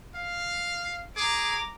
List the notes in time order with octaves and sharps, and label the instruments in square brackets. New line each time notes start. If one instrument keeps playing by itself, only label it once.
[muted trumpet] F5
[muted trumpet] G#4 [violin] A#5 D6